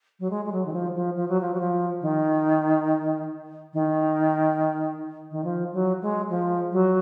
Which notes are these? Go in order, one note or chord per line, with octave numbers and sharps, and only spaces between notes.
F#3
G#3
G#3
F#3
D#3
F3
F3
F3
F#3
F3
F#3
F3
D#3
D#3
D#3
F3
F#3
G#3
F3
F#3